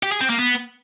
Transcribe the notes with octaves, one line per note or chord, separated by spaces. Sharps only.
G4
G#4
C4
A#3
B3